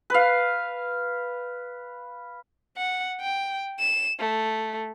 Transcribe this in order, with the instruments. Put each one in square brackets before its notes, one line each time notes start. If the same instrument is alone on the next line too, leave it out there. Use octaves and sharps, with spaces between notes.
[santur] B4 F5
[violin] F#5
G5
E7
A3